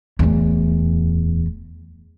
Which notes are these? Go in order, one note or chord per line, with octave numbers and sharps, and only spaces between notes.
D1 E2